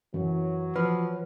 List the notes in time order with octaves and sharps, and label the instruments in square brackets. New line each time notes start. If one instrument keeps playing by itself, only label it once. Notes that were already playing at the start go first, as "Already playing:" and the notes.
[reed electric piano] F#2 [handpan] E3 [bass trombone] F#3
[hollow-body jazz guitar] F3 [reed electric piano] B4 F6